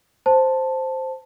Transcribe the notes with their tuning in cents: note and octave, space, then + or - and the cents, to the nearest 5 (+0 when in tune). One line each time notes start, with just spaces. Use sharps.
C5 +0 A5 +0